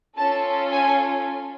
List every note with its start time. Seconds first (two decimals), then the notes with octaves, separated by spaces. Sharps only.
0.17 C#4 F4 A4 A5
0.72 G#5